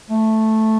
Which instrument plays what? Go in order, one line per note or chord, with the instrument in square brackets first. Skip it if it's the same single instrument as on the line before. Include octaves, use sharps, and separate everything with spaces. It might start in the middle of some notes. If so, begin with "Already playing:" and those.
[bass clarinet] A3